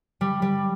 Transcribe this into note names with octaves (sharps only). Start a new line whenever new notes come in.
G3
G3